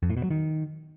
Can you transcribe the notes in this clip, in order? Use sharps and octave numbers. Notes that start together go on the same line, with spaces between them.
F2
A2
B2
F#3
D#3